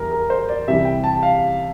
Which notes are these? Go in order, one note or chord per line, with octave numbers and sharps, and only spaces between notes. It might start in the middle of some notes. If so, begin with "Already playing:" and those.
Already playing: E2 E3 G3 A#4
A#4
C5
D5
C2 C3 E3 G3 E5
G5
A5
F5